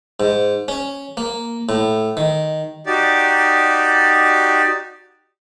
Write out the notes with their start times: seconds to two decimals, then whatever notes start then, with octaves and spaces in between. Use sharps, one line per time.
0.20 G#2
0.68 C#4
1.17 A#3
1.69 A2
2.17 D#3
2.87 D#4 F#4 G4 D5